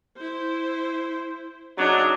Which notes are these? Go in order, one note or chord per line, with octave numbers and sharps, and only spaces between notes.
E4 C5
C#3 F#3 D4 D#4